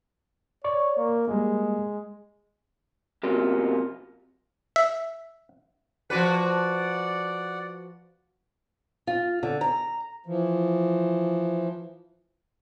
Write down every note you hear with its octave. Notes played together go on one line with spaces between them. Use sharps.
C#5 D5 C#6
A#3
G3 G#3 A#3
F#2 C3 F#3 A#3 B3 F4
E5
F3 F#4 B4 D5 F#5
F4
D3
A#5
E3 F3